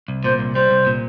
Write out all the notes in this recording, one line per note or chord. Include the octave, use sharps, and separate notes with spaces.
C2
A#2 C5
C2
G3 C5
C2
A#2